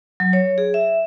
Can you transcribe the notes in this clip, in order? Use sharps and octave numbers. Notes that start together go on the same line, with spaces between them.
F#3
C#5
G#4
E5